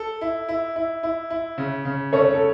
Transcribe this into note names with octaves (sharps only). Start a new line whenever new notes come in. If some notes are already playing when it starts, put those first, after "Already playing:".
Already playing: A4
E4
E4
E4
E4
E4
C#3
C#3
C#3 A4 C#5
A4